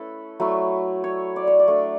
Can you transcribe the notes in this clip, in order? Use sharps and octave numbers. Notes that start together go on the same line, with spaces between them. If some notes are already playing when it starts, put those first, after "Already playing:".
Already playing: A3 C#4 E4 A4 B4
F#3 A3 E4
C#5
D5
C#5
D5
A3 D4